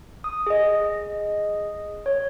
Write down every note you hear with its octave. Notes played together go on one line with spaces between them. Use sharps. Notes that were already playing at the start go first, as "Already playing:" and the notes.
D#6
G#4 D#5
C#5